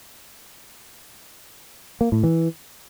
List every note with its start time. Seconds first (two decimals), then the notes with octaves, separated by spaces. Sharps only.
2.01 A#3
2.12 A2
2.23 E3